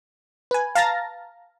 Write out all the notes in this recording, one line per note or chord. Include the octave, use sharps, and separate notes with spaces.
B4 G#5
F5 A5 A#5 A6 A#6